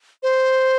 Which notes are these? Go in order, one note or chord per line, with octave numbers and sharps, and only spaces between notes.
C5